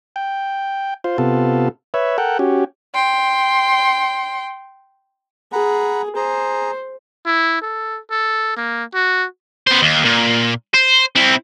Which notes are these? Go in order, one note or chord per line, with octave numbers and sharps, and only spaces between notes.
G5
F4 C5
C3 B3 F4 A4
B4 C#5 E5
A4 A#4 F#5 G5
C#4 F#4 G4
G5 C6
G#4 F#5 A#5 B5
G#4 C5 A#5
E4
A4
A4
A#3
F#4
B3 C5
D#2
A#2
C5
C4 E4